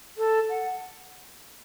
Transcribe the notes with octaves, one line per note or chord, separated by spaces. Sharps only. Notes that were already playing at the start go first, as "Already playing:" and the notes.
A4
F#5